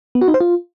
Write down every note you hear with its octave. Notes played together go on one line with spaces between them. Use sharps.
B3
F#4
D#4
C5
F4